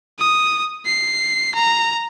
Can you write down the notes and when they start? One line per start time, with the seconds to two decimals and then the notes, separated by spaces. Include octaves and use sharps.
0.19 D#6
0.86 C7
1.55 A#5